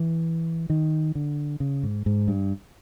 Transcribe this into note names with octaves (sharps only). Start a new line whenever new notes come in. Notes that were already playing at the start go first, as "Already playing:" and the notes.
Already playing: E3
D#3
D3
C#3
G#2
G#2
G2